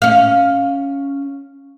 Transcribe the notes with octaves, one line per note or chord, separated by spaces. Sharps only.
C#4 F5